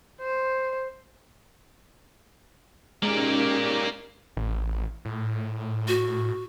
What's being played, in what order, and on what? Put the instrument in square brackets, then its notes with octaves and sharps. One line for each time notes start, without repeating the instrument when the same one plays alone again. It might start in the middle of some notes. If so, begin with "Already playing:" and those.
[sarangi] C5
[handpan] G#3 [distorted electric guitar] A#3 D5 [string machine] C#4 D#4 G4
[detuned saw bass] A1
A2
[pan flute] F#4